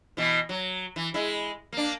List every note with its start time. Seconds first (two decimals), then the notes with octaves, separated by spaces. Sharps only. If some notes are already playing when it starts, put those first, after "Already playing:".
0.17 B2 E3
0.49 F#3
0.96 E3
1.14 G#3 E4
1.72 A#3 D4